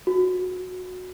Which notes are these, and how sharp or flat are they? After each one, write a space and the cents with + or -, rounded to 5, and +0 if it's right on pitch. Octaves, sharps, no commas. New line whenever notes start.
F#4 -15